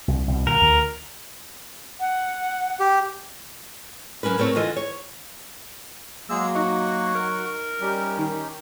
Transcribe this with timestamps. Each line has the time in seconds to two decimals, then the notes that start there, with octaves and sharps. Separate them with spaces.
0.08 C2
0.28 C2 B2
0.47 A#2 D3 A#4
0.61 D2
2.00 F#5
2.80 G4
4.23 F#3 G#3 C#4 A#4 B4
4.38 A2 A3 C4 A#4 C#5
4.55 D3 E3 F4 A4 D#5
4.77 C#5
6.30 F#3 G#3 A#3 G#4 E6
6.55 D#4 F#4 F#5 C#6
7.15 A#4
7.81 G3 C#4 D#4 G4
8.17 D#3